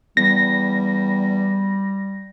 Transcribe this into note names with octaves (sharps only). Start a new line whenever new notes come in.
E2 G3 A#6